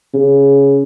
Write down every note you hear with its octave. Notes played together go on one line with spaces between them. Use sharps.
C#3